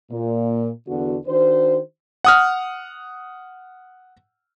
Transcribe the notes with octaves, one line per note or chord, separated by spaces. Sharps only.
A#2
E2 D3 B3 F#4
D#3 D4 F#4 C5
F#5 D#6 F6